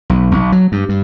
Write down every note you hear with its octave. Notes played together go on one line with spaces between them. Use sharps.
B1
B1
F#3
G2
G2